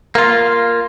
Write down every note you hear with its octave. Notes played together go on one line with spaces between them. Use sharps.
A#3 F4